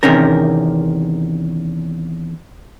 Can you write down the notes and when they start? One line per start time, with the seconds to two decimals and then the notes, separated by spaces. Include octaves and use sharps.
0.03 E2 C3 D#3 C#4 A#4